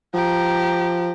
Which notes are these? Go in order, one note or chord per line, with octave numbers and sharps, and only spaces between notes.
F3 G4 A#5